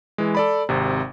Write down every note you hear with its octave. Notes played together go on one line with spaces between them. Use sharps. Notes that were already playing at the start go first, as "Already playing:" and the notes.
E3 G#3
A4 D5 B5
G#1 C3